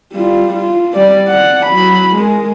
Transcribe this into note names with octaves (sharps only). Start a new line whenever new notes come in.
G3 F4
F4
G3 D5
D5 F#5
F#3 B5
G#3 A#4